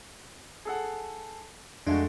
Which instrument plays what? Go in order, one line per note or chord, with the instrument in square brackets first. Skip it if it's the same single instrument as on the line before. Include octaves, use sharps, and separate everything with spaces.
[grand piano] G#4 A4 F#5
[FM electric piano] F2 D4 [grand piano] G#3 A3 F#4